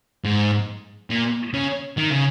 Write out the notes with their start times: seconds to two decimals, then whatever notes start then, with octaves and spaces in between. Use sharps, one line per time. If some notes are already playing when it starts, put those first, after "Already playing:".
0.24 G#2
1.10 A#2
1.54 C#3
1.97 D#3
2.11 C#3